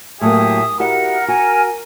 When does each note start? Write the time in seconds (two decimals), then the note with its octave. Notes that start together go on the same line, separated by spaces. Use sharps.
0.21 A2 F#3 A#3 G4 G#4 E5 D#6
0.80 E4 F#4 G4 A#4 F#5
1.28 F#4 G#5